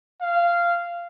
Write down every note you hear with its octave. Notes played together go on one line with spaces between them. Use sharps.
F5